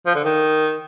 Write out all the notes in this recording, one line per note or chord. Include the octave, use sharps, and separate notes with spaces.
F3
D3
D#3